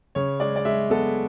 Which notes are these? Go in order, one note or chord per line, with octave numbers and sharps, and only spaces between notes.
C#3 C#5
G#3 D5
D5
G#3 E5
B3 A4